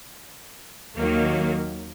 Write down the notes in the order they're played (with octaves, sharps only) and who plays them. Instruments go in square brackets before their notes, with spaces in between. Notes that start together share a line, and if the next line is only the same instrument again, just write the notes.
[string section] D#2 D#3 F#3 A#3